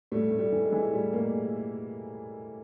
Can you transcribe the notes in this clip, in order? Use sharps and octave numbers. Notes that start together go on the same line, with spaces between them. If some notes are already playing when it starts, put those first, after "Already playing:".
A2 G3 A3
A2
G3 A3
E3
G#3
E3
A2 G3
A2 G#3 A#3